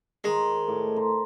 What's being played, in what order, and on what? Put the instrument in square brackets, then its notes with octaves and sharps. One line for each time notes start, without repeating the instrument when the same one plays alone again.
[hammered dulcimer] D#3 C5 [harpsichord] G#3
[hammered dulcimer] A2 A4 D6
C5 A#5 C6